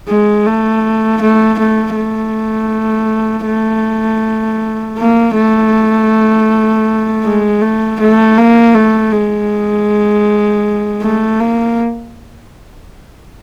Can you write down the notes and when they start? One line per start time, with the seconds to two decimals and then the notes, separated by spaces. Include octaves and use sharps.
0.09 G#3
0.46 A3
1.22 A3
1.59 A3
1.97 A3
3.47 A3
4.99 A#3
5.36 A3
7.24 G#3
7.62 A3
8.00 A3
8.38 A#3
8.75 A3
9.13 G#3
11.02 A3
11.40 A#3